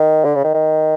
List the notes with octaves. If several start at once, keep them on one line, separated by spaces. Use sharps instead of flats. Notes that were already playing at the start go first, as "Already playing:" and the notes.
Already playing: D#3
D3
C#3
D#3
D#3